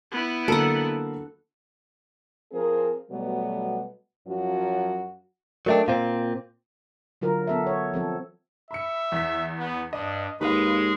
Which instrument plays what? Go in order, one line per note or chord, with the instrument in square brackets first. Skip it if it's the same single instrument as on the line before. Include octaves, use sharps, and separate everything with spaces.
[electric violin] B3 E4
[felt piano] D3 F#3 A#3 [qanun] A4 F#5
[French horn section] F3 C4 G#4 A#4
B2 F#3 G3 A3 B3
F#2 F3 F#3 F#4
[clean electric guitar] F#3 A3 D4 [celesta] A#4 D#5 G5
[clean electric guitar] A#2 C4 [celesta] F5
[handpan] D3 F#3 F4 A#4
B3 A4 E5
C#5
F3 C4 A4
[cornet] E5 [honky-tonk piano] B5 C#7
[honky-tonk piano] E2 B6
[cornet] B3
[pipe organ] G2 [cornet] D4 [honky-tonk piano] D#5
[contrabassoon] D#2 [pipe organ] G#3 G#4 [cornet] B4 [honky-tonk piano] F5 B5